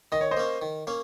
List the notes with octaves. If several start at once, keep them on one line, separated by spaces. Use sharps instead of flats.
D#3 D#5
C#5
C5 D#5
A#3 C#4
D#3
A#3 C#4